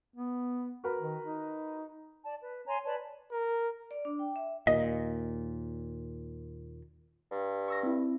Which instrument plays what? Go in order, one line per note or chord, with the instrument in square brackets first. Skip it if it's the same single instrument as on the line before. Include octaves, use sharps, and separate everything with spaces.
[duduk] B3
[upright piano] F#4 A#4 B4
[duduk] D#3
D#4
[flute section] D5 A5
B4
C#5 G#5 A#5 C6
B4 C#5 D5 A5
[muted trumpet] A#4
[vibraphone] D5
D4
G5
E5
[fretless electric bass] D#2 A#2 [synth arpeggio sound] D#5
[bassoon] G2
[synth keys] C#6 E6 A#6
C4 E4